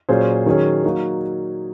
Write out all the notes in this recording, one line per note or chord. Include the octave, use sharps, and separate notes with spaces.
A#2 F#3 C#4 G#4 C5
D#3 F#3 C#4 G#4
F#3 A#3 D#4 F#4